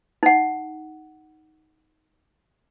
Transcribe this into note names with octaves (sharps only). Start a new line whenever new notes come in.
D#4 F#5